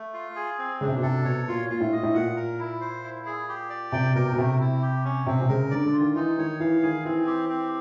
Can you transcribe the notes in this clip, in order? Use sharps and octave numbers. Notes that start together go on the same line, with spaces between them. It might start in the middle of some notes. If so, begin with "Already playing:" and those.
Already playing: A3
F4
G#4
C4
C#3 D4
C3
B2
C3 A4
B2 C#5
A#2 F4
A#2 F4
A2
D#5
A2
A#2 F#5
A#4
E4
C5
E4
G#4
G4
D5
C3 G5
B2 A#4
B2
C3 A3
E4
G4
C#4
C3 C4
C3
C#3 A#4
D3 D5
D3
F4
D#3
E3 D#4
D#3 C#5
E3 F5
D#3 G#4
E3 C4
G4
C4